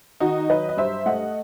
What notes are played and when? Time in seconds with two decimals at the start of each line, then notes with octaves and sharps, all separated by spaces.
0.20 D#3 D#4 F#4
0.49 F#3 B4 D#5
0.69 D#5
0.77 G2 C5 E5
1.06 A3 D#5 F#5